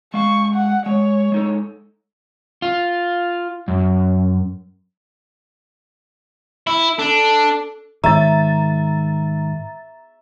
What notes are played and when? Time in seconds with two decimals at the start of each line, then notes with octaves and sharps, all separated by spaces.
0.14 G#3 F5 C#6
0.54 F#5
0.86 G#3 C#5
1.32 G#3 D#4 A4
2.62 F4
3.68 F#2
6.67 E4
6.99 D4 A4
8.04 G#2 D#3 E5 A#5 A6